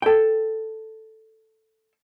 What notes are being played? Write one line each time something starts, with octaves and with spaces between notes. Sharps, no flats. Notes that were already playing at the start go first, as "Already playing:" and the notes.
A4 G5